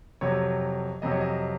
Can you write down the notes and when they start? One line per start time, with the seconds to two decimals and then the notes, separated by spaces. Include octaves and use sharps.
0.21 F2 C3 F#3 C#5
1.02 F2 C3 F#3 D#5
1.11 C#5
1.21 D#5